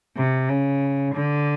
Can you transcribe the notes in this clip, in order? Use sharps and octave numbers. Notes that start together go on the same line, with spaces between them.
C3
C#3
D3